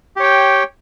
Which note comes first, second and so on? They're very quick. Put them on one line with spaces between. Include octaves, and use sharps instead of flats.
G4 C#5 G5